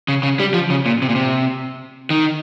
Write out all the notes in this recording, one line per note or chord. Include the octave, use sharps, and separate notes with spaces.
C#3
C#3
G3
F3
C#3
A#2
C3
A#2
C3
D#3